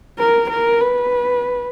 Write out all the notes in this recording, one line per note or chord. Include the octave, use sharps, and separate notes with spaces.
A#4
A#4
B4